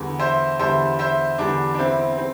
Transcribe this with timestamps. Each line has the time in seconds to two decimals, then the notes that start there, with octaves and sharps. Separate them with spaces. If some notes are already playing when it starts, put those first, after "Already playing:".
Already playing: E2 D3 G3
0.19 C5 E5
0.59 E2 D3 G3 C5 E5
0.99 C5 E5
1.38 E2 D3 G3 D4
1.74 D4
1.79 C4 E4
2.18 C4